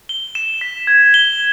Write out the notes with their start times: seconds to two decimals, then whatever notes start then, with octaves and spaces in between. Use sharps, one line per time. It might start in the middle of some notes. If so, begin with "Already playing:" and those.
0.09 G7
0.35 E7
0.61 B6
0.87 G#6
1.14 G7